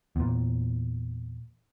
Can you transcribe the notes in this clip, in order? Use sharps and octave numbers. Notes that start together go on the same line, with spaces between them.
E2 A#2